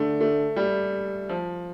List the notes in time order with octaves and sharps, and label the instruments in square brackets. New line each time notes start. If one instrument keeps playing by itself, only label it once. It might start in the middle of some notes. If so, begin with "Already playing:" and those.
Already playing: [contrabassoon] D3 [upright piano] A3
[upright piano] A3
G3
F3